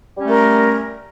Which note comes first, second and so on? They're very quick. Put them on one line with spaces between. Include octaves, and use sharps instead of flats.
G3 C#4 A3 A#4